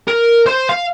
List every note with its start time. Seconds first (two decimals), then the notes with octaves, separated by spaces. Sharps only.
0.08 A#4
0.46 C5 C6
0.69 F5